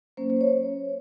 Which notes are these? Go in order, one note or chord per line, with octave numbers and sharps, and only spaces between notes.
F#3 A#3 C#4 C5
C5
C#5